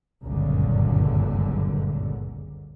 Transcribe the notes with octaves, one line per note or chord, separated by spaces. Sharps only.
G1 C#2 F#2 A#2 D3